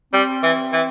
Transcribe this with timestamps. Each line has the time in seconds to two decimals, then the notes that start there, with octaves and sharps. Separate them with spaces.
0.13 G3 C4
0.43 E3
0.73 E3